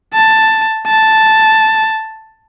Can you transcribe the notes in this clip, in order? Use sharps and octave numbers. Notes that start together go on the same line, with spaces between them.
A5
A5